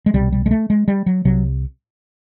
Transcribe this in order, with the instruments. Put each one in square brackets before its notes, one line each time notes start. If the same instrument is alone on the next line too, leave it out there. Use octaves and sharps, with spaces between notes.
[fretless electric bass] G#3
C2 B2 G3
G3
G#3
A3
G#3
G3
F#3
C2 C3 F#3